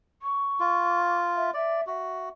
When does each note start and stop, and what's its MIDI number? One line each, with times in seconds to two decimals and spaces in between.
0.22 1.16 85
0.60 1.50 65
1.35 1.50 76
1.54 1.81 74
1.54 1.85 76
1.87 2.29 66
1.87 2.27 76